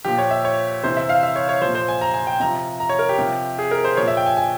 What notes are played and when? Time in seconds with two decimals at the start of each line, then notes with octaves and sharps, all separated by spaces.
0.05 A#2 F3 G4
0.18 C#5
0.31 E5
0.45 C#5
0.83 C3 E3 C5
0.97 E5
1.09 F5
1.23 E5
1.36 C#5
1.49 C#5
1.62 A#2 F3 C5
1.75 C5
1.88 G#5
2.01 A#5
2.14 G#5
2.27 G5
2.40 C3 F3 A#5
2.80 A#5
2.89 C#5
2.99 A#4
3.09 G4
3.18 C3 F3
3.59 G#4
3.71 A#4
3.84 C5
3.97 A#2 F3 C#5
4.08 E5
4.17 G5
4.26 G#5
4.37 G#5